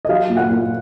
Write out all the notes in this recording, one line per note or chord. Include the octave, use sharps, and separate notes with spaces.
D#5
F#3 F5
A#2
F#5
A#2